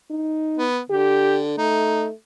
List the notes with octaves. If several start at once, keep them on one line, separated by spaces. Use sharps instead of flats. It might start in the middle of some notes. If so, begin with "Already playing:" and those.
D#4
B3
D3 G4
A3 D#4